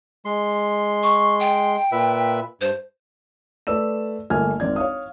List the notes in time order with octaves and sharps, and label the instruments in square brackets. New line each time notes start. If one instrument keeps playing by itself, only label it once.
[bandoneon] G#3 C6
[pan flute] C#6
G5
[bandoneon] A#2 B4 E5
[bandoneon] G2 [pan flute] C5
[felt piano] A3 B4 D5 E6 E7
G1 A3 A#3 G#5 F6 G#6
G#1 C4 D5 G#6
C#5 F5 D#6